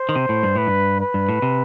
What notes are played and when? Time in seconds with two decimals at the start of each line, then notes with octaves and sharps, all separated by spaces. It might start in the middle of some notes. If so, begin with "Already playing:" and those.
Already playing: C5
0.09 D#3
0.15 C3
0.29 A2
0.43 G2
0.55 A2 B4
0.67 G2
1.01 B4
1.14 G2
1.29 A2
1.42 C3